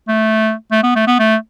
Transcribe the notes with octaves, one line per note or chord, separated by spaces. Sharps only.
A3
A3
B3
A3
B3
A3